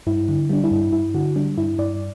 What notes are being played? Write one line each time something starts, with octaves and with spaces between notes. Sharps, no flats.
G2 E4
D3
G3 D4
E4
G2
G2 E4
D3 F#4
G3 D4
G2 E4
G2 D5